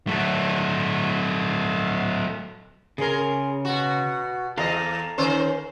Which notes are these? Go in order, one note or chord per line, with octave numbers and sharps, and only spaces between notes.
F#3 A3
C#3 G#4 A#4 C6
B2 F#4
E2 A4 D#5 F5 A#5
D#3 C#4 C5